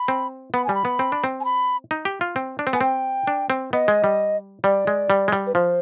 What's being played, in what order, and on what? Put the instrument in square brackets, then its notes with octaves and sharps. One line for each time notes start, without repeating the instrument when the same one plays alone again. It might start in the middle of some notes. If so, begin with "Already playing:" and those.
Already playing: [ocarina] B5
[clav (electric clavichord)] C4
[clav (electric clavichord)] B3 [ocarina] B5
[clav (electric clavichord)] G3 [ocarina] G#5
[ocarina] B5
[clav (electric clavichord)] B3
C4
D4
C4
[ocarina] G#5
B5
[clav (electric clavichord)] D#4
G4
F4
C4
D4
C4
[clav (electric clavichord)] B3 [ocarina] G#5
[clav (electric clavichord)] C4 [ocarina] G5
[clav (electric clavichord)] D4
C4
[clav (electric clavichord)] B3 [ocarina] D#5
[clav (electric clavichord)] G#3
G3
[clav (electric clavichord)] G3 [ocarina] D5
[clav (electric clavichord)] G#3
G3
G#3
G3
[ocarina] B4
[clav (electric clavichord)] F3 [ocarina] C5